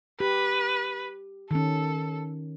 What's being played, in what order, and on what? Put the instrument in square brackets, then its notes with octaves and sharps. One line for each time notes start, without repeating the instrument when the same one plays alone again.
[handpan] G4 [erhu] B4
[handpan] D#3 C#4 [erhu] A4